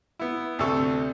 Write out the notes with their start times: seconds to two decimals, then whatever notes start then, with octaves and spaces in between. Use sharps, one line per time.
0.19 B3 E4
0.59 D2 C3 A4 C#6